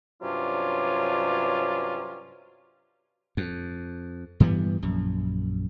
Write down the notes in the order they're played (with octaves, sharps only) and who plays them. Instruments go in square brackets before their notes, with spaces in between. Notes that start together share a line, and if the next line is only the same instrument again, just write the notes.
[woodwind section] G2 C3 F#3 C#4 D4 F4
[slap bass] F2
G2 E3 G3 B3
A#1 F#2